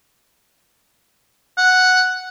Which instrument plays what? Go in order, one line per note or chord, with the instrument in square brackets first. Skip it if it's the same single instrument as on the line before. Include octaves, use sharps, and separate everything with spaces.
[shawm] F#5